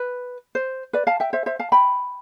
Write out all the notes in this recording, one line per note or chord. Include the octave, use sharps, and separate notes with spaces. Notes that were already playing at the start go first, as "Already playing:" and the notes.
Already playing: B4
C5
B4 D5
F5 A5
E5 G5
C5 E5
C5 E5
F5 A5
G5 B5